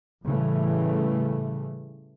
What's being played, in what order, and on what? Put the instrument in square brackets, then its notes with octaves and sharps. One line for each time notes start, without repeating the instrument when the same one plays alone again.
[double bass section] A2 C#3 E3 G3 A3